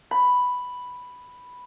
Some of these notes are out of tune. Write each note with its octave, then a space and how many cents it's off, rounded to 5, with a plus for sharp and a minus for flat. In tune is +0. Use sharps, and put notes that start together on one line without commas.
B5 +0